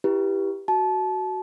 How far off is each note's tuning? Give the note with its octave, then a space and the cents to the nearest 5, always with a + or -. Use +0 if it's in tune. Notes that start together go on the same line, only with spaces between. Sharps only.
E4 +0 G4 +0 B4 -25
F#4 +10 A5 -25